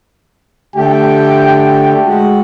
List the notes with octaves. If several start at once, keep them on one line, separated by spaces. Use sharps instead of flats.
D3 A3 G4 G5
G#3 F#4